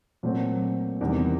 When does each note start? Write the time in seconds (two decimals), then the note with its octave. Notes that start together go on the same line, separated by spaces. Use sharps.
0.23 A#2 F#3 A3 C4
1.01 E2 C3 D#3 G3